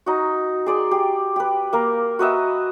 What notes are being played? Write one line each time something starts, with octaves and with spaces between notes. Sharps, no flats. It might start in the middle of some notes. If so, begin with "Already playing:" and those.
D#4 F#4
G#4 D5 C6
G4
G4 B4
A#3 A#4 F5
F#4 B4 D#5 E5